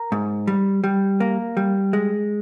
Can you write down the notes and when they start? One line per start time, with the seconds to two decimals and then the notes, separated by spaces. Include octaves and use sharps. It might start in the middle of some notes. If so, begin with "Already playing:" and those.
Already playing: A#4
0.12 G#2
0.47 G3
0.84 G3
1.20 A#3
1.57 G3
1.93 G#3